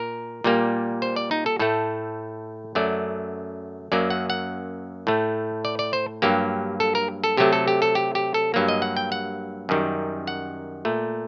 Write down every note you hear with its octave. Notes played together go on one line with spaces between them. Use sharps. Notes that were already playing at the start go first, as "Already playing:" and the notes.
Already playing: A#2 A#4
A#2 G3 A#3
C5
D5
D#4
A4
A2 A3 A4
F#2 F#3 A3 D5
F#2 F#3 A#3 D5
F#5
F#5
A2 A3
D5
D5
C5
G2 F#3 A#3 G4
A4
A#4
A4
C3 F#3 A3 G4
A4
G4
A4
G4
G4
A4
G2 F#3 A#3
D#5
F#5
G5
F#5
F#2 D#3 G3
F#5
A#2 A3